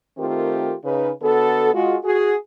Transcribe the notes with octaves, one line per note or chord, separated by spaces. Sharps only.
D#3 A3 C4 F4 G4 A#4
C#3 D#4 B4
D3 B3 F#4 A4
G#3 F4 F#4
F#4 G#4